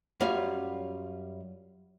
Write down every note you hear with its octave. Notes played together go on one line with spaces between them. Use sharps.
F#2 G3 C#4 F4